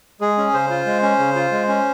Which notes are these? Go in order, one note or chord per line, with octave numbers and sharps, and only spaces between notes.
G#3 G#4
C#4
C#3 C5
F4
G#3
C#4
C#3
F4
G#3
C#4